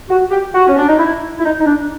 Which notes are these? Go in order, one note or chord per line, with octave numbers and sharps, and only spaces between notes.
F#4
G4
F#4
C#4
D4
D#4
E4
E4
D#4
D#4
D4